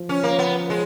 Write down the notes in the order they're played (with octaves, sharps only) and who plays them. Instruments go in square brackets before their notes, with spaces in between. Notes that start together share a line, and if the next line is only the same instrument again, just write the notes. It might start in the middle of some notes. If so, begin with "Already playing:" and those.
Already playing: [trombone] F3
[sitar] C#4
A#3
B3
G#3